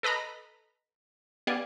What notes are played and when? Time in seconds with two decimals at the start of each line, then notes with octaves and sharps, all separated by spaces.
0.03 A4 B4 D#5 A#5 B5
1.47 B3 G4 D5 F5 G#5